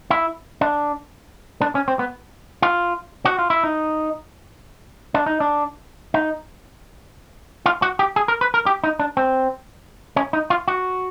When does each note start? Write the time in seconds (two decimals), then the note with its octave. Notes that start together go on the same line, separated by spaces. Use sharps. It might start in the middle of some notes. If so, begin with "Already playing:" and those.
0.10 E4
0.61 D4
1.62 D4
1.75 C#4
1.88 C4
1.99 B3
2.62 F4
3.25 F#4
3.39 F4
3.50 E4
3.64 D#4
5.14 D4
5.26 D#4
5.40 D4
6.14 D#4
7.66 F4
7.82 F#4
7.99 G4
8.16 G#4
8.28 A#4
8.41 B4
8.54 A#4
8.66 G4
8.84 D#4
9.00 D4
9.17 C4
10.16 C#4
10.33 D#4
10.50 F4
10.68 F#4